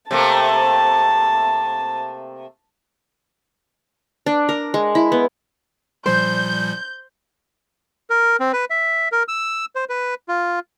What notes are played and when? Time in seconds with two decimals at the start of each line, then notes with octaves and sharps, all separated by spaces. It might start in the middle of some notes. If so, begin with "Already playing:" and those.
0.11 C3 A3 A#3 A5
4.26 D4
4.49 A#4
4.74 G#3
4.95 E4
5.12 B3
6.06 A#2 F3 G3 C5 G6
8.10 A#4
8.40 C4
8.53 B4
8.70 E5
9.12 A#4
9.28 E6
9.76 C5
9.89 B4
10.29 F4